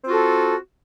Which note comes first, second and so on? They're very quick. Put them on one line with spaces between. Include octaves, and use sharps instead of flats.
C4 F4 F#4 A4